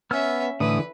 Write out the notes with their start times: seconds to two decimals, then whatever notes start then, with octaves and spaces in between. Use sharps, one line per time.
0.11 B3 C#4 E5 E6 F6
0.60 A2 D3 E3 B4 D#6